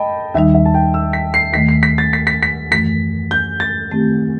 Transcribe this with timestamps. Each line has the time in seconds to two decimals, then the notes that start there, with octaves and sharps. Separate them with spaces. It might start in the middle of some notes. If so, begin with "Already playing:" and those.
Already playing: D#5 G5 A5 B5
0.34 D#2 D#3 G3 D#4 E5
0.54 E5
0.65 A5
0.74 G5
0.94 E6
1.13 B6
1.34 C7
1.53 D#2 D#3 A3 B6
1.68 C7
1.83 B6
1.98 A6
2.13 B6
2.27 B6
2.43 B6
2.71 F#2 E3 A3 B6
3.31 G6
3.60 A6
3.90 D#3 A3 C4 E4 G4